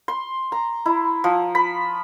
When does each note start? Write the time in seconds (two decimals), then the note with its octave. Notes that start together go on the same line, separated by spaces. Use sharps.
0.08 C6
0.52 A#5
0.86 E4
1.24 F3
1.55 B5